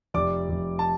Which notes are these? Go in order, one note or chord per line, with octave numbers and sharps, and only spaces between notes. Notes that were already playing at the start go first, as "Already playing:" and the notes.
F1 D5 D6
F1
A5